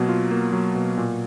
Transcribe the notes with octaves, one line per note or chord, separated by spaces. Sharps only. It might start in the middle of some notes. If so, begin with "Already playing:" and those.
Already playing: B2 F#3 A#3
F4
A#3
F#3
B2
A#2